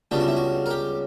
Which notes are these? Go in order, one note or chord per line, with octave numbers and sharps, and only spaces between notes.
C#2 C#3 G3 B3 D4 G4
F#4
E4
F#4
A#4
G4